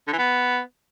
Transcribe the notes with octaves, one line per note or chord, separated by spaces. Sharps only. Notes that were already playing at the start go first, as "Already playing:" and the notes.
D3
E3
B3